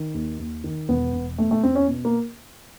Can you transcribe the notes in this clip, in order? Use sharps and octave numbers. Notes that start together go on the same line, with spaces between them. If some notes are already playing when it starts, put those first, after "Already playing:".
Already playing: D#3
D#2
D#2
D#3
E1 B3
E1
B2 A3
A3
E2 C4
C#4
B2
A#3